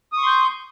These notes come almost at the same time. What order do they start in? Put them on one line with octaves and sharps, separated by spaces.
D#6 C#6 C6 G6